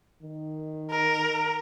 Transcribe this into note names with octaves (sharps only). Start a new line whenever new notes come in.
D#3
A#4